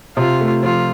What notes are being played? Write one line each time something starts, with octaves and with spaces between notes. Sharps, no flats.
C3 F4
A3
F3 F4